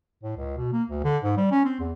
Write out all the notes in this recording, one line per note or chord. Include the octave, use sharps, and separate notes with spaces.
A2
C#2
B2
A#3
D2
D3
G#2
G3
C#4
C4
E2